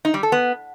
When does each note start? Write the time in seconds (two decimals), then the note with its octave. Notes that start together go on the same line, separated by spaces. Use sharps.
0.05 D#4
0.14 G3
0.23 A4
0.32 B3